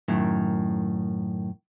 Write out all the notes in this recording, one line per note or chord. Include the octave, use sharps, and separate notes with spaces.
F#2 A2 D#3